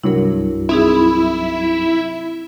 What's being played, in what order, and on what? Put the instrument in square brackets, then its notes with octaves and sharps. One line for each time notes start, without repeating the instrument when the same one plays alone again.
[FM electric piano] C2 G2 F#3 [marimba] E4 A#4
[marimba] C4 D#4 G#4 [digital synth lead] E4